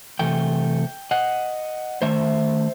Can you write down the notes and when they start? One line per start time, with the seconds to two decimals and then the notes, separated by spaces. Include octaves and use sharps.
0.19 C3 E3 A3 G5
1.11 D#5 F#5
2.02 D#3 A3 C5 E5